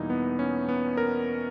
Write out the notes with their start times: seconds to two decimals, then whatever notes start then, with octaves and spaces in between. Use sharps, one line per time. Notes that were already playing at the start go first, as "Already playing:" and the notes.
Already playing: E2 B2 G3 A#3 D#4 E4
0.10 B3
0.39 C#4
0.69 B3
0.97 A#4